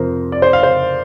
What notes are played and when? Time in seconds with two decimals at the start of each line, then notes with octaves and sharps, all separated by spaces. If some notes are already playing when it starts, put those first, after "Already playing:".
Already playing: F2 C3 F3 A#4 C5
0.32 D5
0.42 C5
0.53 F5
0.63 C5